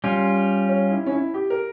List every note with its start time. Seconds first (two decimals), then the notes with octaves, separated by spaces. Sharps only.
0.04 G3 C#4 F4
0.69 C#5
0.91 E4
1.06 C#4
1.11 E4
1.34 G4
1.50 A#4